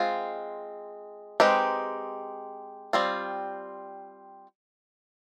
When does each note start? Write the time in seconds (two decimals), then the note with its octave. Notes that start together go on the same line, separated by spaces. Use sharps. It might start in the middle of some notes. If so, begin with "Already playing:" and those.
Already playing: G#3 C4 F4
1.40 G#3 C4 D#4 G4 B4
2.93 G3 C4 F4